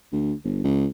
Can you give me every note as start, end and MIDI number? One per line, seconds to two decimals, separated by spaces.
0.12 0.33 38
0.44 0.61 31
0.64 0.87 37